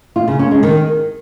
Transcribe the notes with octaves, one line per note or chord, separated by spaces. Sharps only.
F4
C#3
C#4
G#3
D#3